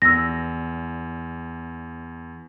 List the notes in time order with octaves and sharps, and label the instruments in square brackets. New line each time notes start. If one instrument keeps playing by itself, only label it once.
[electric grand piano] E2 [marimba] E6 A#6